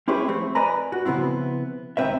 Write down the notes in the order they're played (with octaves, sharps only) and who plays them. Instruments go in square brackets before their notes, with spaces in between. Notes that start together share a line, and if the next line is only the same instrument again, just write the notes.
[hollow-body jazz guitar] C4 C#4 E4 G4 G#4 B4
F3 A3 C4
B4 D5 D#5 G#5 A#5 B5
F#4
C#3 F3 B3 C4 E4
C#2 D#3 F3 C4 B4 E5